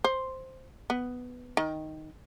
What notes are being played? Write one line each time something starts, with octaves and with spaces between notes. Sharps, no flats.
C5
B3
D#3